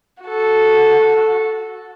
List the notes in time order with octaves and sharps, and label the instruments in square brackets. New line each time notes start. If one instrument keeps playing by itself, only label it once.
[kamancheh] F#4 A4